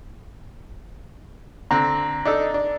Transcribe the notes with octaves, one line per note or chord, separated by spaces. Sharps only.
D3 C4 A#5
D4 D#4 A4
D4